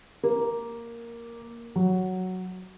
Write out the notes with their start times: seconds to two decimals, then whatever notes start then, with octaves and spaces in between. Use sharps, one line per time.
0.24 A#3
1.76 F#3